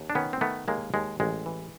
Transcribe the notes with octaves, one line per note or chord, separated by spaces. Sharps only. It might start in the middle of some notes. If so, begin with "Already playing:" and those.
Already playing: D#2
D4
D#3 B3 C#4
C4
D#3 A3 B3
D#2 G#3 A#3
D#2 G#3
A1 G#3
E3